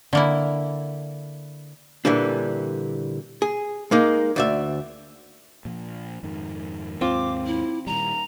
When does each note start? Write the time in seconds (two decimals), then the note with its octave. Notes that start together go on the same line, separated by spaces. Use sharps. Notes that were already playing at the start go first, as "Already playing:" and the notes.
0.13 D3 A#3 E4
2.05 A#2 D3 E3 G3 D4
3.42 G#4
3.91 G#3 A#3 D#4
4.36 D2 D5 E5
5.65 A#2 F3
6.23 F2 G#2 D#3
7.01 D#2 G#2 C4 F4 D6
7.46 E4
7.87 A#2 D#3 G3 A#5